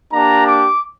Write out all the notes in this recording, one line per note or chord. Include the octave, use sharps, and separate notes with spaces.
A#3 D4 G4 A#5
D6